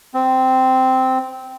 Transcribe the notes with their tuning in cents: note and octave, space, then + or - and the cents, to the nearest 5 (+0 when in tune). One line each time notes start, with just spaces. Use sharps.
C4 -10